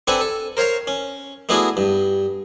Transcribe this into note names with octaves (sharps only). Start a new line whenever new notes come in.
C4 D4 A4 B4 F#5 G#5
A4
A#4 C5 C#5 F5 A#5
C#4
A3 B3 D4 E4 F#4 G#4
G2